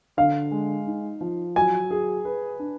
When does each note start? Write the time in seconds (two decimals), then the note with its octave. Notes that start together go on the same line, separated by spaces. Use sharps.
0.17 D3 F5
0.51 G#3
0.87 D#4
1.21 F3
1.56 F#3 G#5
1.91 G#4
2.25 B4
2.59 D4